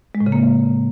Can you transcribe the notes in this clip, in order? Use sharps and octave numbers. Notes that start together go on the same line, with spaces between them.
G#3
A2
C#3
A#3